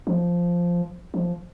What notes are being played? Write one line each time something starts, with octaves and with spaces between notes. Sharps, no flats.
F3
F3